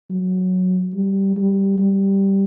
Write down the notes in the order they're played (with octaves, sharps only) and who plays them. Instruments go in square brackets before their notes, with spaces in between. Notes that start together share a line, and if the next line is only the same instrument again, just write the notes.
[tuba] F#3
G3
G3
G3